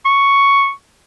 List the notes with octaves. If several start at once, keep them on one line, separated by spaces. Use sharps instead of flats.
C#6